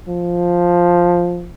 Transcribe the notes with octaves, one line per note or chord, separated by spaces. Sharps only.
F3